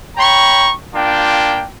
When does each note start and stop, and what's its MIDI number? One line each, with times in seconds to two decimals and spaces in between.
0.17 0.70 73
0.17 0.70 79
0.17 0.70 82
0.17 0.70 83
0.17 0.70 85
0.94 1.64 58
0.94 1.64 62
0.94 1.64 65
0.94 1.64 79